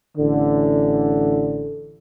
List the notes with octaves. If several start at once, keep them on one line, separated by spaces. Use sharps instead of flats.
A1 D3